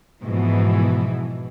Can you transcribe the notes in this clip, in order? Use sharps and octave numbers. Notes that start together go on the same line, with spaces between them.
G#2 B2 E3 F3